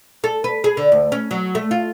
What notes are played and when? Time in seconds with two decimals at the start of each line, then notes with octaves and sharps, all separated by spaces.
0.24 A4
0.44 B4
0.64 G#4
0.77 D3
0.92 D2
1.12 C#4
1.31 F#3
1.55 A3
1.71 F4